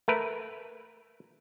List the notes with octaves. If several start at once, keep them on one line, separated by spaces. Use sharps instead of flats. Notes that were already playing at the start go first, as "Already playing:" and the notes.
A3 A#4 B4